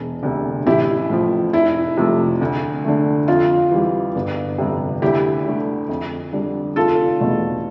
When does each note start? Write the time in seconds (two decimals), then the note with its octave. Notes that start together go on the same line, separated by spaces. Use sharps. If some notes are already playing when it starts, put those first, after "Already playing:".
Already playing: E1
0.23 D2 C3
0.66 A1 E4 G4
1.10 A2 F3
1.53 F1 E4
1.97 F2 C3 F3 A3
2.41 D2
2.84 D3 A3
3.28 F2 F4
3.71 E3 G3
4.15 G1
4.58 F2 C3 G3
5.02 D2 E4 G4
5.46 D3 A3
5.89 F2
6.33 D3 G3
6.76 F1 F4 A4
7.20 E2 B2 A3